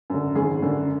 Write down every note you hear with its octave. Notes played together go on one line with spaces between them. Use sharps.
F#2 D3
G#1 G#4
F#2 D3